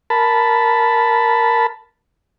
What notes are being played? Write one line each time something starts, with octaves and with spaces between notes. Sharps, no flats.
A#4 A5 B5